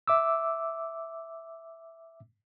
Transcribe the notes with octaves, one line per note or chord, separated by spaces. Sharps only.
E5 D6 E6